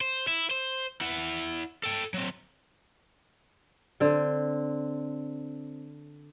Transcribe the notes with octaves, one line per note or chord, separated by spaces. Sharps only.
C5
E4
C5
E4 F#5
A4 G5
F#3 C4
D3 C4